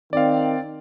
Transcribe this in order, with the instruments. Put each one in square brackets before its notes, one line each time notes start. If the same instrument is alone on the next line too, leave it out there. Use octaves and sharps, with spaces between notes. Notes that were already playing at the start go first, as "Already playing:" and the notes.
[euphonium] D#3 [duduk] C4 [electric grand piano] D5 F5